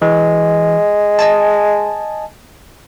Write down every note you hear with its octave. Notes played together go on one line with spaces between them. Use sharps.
E3 G#3
D#5 G#5 A5